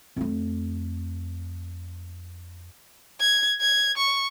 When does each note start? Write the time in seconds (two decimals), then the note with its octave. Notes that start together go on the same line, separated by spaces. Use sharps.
0.16 F2 A3
3.20 G#6
3.61 G#6
3.97 C#6